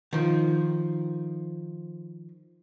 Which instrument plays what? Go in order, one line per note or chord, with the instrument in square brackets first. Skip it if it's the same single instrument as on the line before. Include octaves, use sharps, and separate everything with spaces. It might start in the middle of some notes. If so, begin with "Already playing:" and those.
[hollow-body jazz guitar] D#3 F3